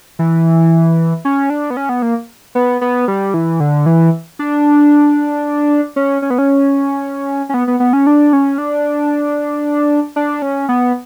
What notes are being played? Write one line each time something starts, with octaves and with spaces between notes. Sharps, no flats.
E3
C#4
D4
B3
C#4
B3
A#3
B3
B3
G3
E3
D3
E3
D4
C#4
C#4
B3
C#4
C#4
B3
B3
B3
C#4
D4
C#4
D4
D4
C#4
B3